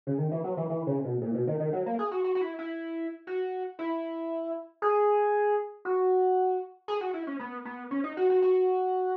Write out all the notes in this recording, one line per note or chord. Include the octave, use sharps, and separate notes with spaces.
C#3
D#3
E3
F#3
E3
E3
C#3
B2
A#2
B2
D#3
D#3
F#3
A#3
G#4
F#4
F#4
F#4
E4
E4
F#4
E4
G#4
F#4
G#4
F#4
E4
C#4
B3
B3
C#4
D#4
F#4
F#4
F#4